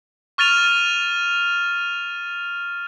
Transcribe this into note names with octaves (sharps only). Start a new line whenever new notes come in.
C#6 F6 A6 D#7 F7